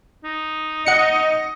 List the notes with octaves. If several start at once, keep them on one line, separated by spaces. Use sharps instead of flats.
D#4
D#5 F#5 C#7